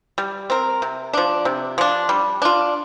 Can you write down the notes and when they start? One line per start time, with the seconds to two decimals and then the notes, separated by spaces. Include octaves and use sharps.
0.18 G3
0.50 C4 A#4
0.82 C3
1.13 F3 D4
1.45 C3
1.78 F3 D4
2.09 G3
2.42 D4 F4